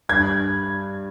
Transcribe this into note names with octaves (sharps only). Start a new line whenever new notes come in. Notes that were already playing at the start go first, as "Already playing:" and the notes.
G2 G#6